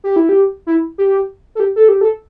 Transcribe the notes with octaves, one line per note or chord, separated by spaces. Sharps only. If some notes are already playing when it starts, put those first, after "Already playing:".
G4
E4
G4
E4
G4
A4
G4
A4
G4
A4